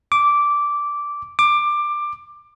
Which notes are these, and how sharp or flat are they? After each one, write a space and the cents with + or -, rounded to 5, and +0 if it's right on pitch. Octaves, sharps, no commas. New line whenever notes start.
D6 -10
D6 +15